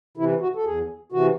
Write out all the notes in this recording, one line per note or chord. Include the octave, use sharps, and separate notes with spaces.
C3 E3 E4
F#4
A4
E2 G#4
C3 E3 F#4